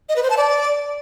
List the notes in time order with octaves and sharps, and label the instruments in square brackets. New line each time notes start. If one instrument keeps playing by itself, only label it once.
[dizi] D#5
B4
C5
A5
D5